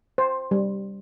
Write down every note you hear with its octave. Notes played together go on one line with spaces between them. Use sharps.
C5
G3